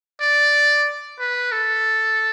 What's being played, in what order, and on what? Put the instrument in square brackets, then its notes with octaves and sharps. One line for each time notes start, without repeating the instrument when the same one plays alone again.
[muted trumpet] D5
B4
A4